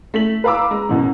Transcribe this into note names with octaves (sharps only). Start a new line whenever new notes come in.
A3 B6 F#7
B4 F5 A#5 B5 D6 E6
G#3 A#5
F#2 B2 E3